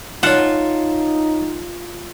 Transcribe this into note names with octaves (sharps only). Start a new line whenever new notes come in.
D#4 F4 C#5 F#5 A5